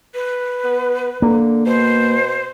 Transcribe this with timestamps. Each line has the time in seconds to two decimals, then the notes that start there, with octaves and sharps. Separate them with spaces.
0.14 B4
0.64 B3
1.22 D3 A#3
1.66 B2 C5